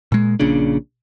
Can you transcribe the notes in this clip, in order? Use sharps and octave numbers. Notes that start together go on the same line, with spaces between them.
A#2 G#3
A#1 A#2 C#3 D4